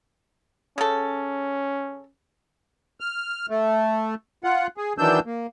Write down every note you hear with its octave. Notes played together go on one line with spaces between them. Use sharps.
C#3 C#4 A4
F6
A3
F4 F#5
G#4
D#3 E3 F#3 D4 E6 G6
A#3